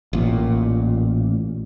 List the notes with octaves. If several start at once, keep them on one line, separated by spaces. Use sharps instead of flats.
A1 A#2